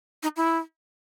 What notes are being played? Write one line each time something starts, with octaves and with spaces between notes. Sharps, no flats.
D#4
E4